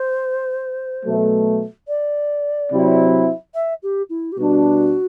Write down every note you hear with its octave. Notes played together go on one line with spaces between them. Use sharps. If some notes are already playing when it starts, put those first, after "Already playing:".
Already playing: C5
B2 F#3 A3
D5
C3 F#3 C4 E4
E5
G4
E4
G4
B2 G3 D4 F#4